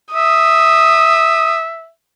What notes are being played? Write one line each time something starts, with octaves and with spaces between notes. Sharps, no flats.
E5 D#6